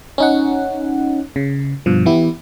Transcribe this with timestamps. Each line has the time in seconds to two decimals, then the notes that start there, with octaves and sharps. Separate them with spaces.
0.18 C#4 D#4 F#5
1.36 C#3
1.86 G2 B2 F3
2.06 E3 B3 E4 G4